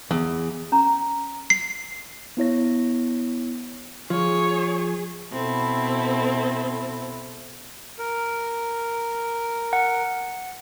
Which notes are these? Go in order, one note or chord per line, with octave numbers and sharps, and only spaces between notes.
E2
C#4 A#5
C7
B3 E4 C#5 A#6
F3 G#4 C#5
B2 C4 E4 A4
A#4
F#5